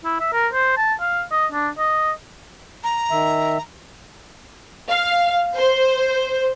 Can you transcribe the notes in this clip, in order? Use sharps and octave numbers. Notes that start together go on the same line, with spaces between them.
E4
E5
A#4
C5
A5
F5
D#5
D4
D#5
A#5
D#3 E5
F5
C5